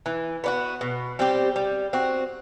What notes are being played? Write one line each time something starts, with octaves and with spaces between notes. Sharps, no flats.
E3
B3 D4 F#4
B2
G3 C4 G4
G3
C4 F#4